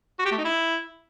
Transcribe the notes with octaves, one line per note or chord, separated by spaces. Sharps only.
F#4
G4
A3
D#4
E4